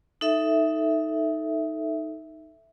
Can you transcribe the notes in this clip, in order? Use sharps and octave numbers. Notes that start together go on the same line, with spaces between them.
D#4 A4 E5